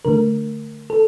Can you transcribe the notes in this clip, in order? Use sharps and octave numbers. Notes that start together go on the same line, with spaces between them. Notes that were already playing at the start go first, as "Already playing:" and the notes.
D3 A3 A#4
A4